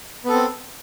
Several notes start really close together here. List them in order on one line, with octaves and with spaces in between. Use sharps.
B3 A4 C4